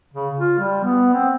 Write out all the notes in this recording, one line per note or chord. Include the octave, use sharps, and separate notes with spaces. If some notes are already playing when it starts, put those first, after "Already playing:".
C#3
F4
G3
B3
C4